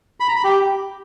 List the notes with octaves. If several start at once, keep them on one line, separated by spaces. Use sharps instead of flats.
B5
A#5
B5
G4